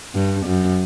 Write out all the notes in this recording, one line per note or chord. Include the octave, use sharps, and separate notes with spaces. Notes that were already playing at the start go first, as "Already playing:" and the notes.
G2
F#2